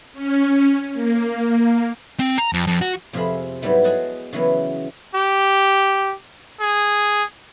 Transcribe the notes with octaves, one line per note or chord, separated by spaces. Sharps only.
C#4
A#3
C4
A#5
F2
F2
F#4
F2 C3 F4 G#4 E5 B5
G#2 F#3 G3 B3 E4
G#3 G#4 D#5 F#5 A5
C#3 E3 F#3 B3
G4
G#4